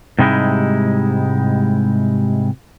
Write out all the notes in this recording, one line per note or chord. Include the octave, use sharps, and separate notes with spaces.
G#2 C3 G3 G#3 D#4 E4